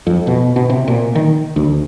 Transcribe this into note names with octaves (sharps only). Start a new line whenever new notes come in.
F2
B2
B2
C3
A#2
D#3
D2